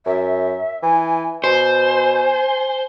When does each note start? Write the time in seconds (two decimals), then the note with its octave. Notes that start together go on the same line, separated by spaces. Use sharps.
0.06 F#2 E5
0.83 E3 G#5
1.44 B2 C5 G#5